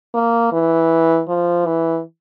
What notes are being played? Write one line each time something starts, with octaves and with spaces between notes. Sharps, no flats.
A#3
E3
F3
E3